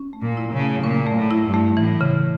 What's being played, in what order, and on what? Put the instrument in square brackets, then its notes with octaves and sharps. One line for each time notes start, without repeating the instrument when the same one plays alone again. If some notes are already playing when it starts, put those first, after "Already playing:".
Already playing: [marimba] C#4
A3
[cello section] A#2
[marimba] E4
[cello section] C#3
[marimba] A3
[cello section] A#2 [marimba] C#4
[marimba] A3
[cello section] A2
[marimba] E4
[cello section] G2
[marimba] A3
[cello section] A2 [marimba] E3
[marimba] C#3